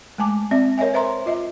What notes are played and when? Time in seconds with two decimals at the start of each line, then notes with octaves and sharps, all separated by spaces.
0.18 G#3 A3 G#5 A5 D6
0.51 C4 D5 E5
0.78 A#4 C#5 D#5 E5 G#5
0.94 B4 C5 E5 A#5 C6
1.26 F4 D#5 E5